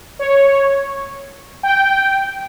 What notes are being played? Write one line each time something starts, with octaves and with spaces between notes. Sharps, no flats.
C#5
G5